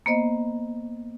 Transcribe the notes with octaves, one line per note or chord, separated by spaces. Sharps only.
A#3 B3 C5 D#5